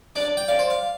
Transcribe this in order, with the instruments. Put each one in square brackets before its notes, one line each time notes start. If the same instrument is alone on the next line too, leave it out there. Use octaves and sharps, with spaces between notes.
[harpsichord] D4 [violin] D5
[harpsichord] G5
[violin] D5 [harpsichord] F5
[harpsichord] C5
F5